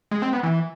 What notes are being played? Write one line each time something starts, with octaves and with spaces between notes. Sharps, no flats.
G#3
C4
B3
E3